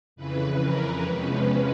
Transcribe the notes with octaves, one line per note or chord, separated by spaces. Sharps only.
F2 C#3 E3 B4
A#4
E2 C3 F3 G#3 C#4 B4